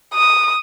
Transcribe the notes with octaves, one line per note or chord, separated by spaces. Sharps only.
D#6